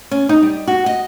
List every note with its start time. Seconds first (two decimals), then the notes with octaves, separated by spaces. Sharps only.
0.11 C#4
0.29 D#4
0.43 G3
0.67 F#4
0.86 D#5